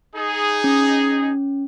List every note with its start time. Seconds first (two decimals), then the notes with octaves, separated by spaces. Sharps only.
0.16 D#4 G#4
0.64 C#4